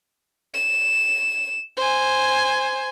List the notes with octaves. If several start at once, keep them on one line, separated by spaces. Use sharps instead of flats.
E7
C5 G#5